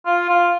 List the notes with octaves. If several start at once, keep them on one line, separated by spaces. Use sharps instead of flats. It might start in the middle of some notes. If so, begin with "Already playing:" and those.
F4
F4